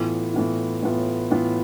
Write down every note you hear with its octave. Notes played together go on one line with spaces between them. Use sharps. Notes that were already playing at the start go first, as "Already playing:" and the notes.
Already playing: A2 E3 B3 F4
A2 E3 B3 F4
A2 E3 B3 F4
A2 E3 B3 F4